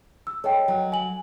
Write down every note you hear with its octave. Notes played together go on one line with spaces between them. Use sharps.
E6
A4 C#5 D#5 G5
F#3
G#5 F#7